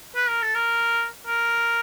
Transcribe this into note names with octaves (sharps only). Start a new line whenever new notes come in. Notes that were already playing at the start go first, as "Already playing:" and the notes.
B4
A#4
A4
A#4
A#4